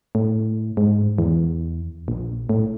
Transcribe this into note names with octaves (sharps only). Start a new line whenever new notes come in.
A2
G#2
E2
A#1
A2